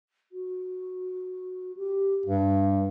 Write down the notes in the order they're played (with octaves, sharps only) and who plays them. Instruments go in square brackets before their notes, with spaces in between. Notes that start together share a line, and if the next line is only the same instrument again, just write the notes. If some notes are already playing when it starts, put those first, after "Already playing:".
[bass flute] F#4
G4
[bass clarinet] G2 [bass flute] G3